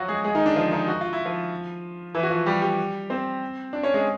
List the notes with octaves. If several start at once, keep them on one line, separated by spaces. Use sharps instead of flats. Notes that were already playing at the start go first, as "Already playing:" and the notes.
Already playing: F3 F#3 F4 F#4
G#3 G#4
G#3 G#4
D#3 D#4
D3 D4
F3 F4
D#3 D#4
F#4
F4
E4
F3 F4
E3 E4
F#4
F3 F4
G3 G4
G3 G4
C4 C5
D4 D5
C#4 C#5
G#3 G#4